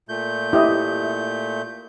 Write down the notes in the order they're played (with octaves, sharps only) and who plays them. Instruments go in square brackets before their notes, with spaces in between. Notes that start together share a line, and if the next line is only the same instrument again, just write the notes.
[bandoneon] A#2 A3 G6
[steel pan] E4 G4 D#5